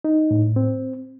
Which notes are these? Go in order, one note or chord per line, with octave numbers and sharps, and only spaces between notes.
D#4
A2
C4